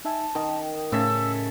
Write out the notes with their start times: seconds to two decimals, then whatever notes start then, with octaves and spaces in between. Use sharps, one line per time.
0.05 D#4 E5 G#5 A5
0.35 D#3 A#4 D#5
0.92 A2 C#3 A4 E5 E6